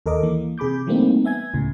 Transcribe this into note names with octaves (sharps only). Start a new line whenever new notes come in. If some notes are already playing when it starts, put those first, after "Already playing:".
D#2 A4 A#4 D#5 D6
E3 A#3
C3 G#4 B5 D6 G6
E3 G3 A3 A#3 C4 D#4
B3 E5 G#5 G#6
C#2 A2 C#3